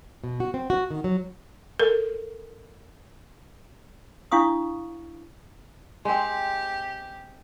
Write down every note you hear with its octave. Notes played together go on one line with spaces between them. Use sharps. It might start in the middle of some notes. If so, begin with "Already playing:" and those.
B2
F#4
C4
F#4
D#3
F#3
A4 A#4
D4 E4 F5 C#6 D#6
G#3 C4 G4